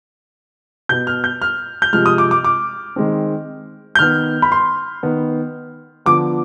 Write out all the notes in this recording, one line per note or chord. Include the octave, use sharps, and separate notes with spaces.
B2 B3 G6
F6
G6
F6
G6
C3 F3 G#3 F6
D#6
D6
D6
D6
D#3 G#3 C4
G6
D#3 B3 F6
B5
C6
D#3 B3
D3 F3 B3 D6